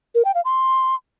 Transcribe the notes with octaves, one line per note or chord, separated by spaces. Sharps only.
A#4
G5
F5
C6